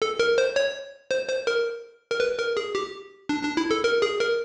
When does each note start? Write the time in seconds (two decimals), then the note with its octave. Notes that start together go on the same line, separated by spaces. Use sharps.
0.02 A4
0.19 A#4
0.38 C5
0.56 C#5
1.11 C5
1.29 C5
1.47 A#4
2.11 A#4
2.20 B4
2.38 A#4
2.57 G#4
2.75 G4
3.29 D4
3.43 D4
3.57 E4
3.71 A4
3.84 A#4
4.02 G#4
4.20 A#4